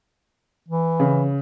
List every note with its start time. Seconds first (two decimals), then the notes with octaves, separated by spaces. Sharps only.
0.68 E3
1.00 C#3